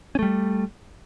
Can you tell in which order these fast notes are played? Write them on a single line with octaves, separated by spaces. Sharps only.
C#4 A3 G3